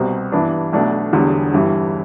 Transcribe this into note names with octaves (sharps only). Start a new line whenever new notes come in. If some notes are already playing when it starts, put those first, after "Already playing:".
Already playing: C2 B2 G3 C4
G2 E3 B3 D4
B1 B2 A3 D4
E1 E2 D3 G3
G1 G2 E3 G3